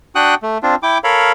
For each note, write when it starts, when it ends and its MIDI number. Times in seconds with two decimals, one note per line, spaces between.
0.15 0.35 62
0.15 0.35 66
0.15 0.35 78
0.15 0.35 79
0.15 0.35 87
0.15 0.35 90
0.43 0.58 57
0.63 0.75 60
0.63 0.75 62
0.63 0.75 65
0.83 0.98 64
0.83 0.98 79
0.83 0.98 86
1.04 1.32 69
1.04 1.32 70
1.04 1.32 73
1.04 1.32 77
1.04 1.32 83